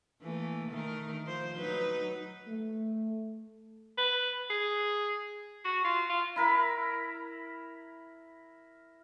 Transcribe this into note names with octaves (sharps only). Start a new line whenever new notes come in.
E3 A3 A#3
D#3 A3 A#4
F3 C5
F#3 D#4 B4
A3
B4
G#4
F#4
F4
F4
E4 A#4 B5